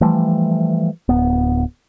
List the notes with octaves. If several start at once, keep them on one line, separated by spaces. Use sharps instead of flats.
E3 F3 G3 A3
D1 B3